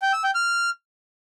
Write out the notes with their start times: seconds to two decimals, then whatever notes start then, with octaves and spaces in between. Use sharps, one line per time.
0.02 G5
0.13 E6
0.24 G5
0.35 F6